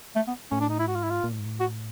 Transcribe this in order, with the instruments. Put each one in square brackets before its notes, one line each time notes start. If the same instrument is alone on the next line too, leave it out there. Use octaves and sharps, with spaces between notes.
[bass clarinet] A3
B3
[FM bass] A2 [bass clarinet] C#4
[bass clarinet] D4
D#4
E4
[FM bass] G#2 [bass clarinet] F#4
[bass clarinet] F4
E4
F4
[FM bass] A#2
A2
G#2
A2
[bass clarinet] F#4